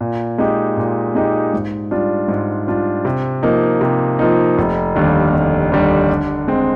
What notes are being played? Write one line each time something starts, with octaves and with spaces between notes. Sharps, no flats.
A#2
G#3 D#4 G4
A#2
G#3 D#4 G4
G#2
G3 D4 F4
G#2
G3 D4 F4
C3
F3 A#3 D#4
C3
F3 A#3 D#4
F1
D#2 D3 G3
F1
D#2 D3 G3
D3
G#3 C4